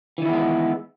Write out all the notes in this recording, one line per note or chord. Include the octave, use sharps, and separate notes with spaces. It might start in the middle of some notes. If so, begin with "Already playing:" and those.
D#3 E3 G#3 B3 E4